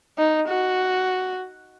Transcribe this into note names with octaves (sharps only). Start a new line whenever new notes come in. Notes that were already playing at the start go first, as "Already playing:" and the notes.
D#4
F#4